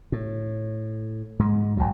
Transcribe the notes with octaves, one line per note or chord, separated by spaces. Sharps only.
A2
G#2 G#3
G#1 C#2 G2 F#3